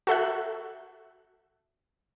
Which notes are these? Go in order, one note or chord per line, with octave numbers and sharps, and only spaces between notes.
F#4 A4 E5 F#6